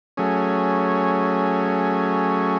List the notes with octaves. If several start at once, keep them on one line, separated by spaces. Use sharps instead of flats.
F#3 A3 C#4 G#4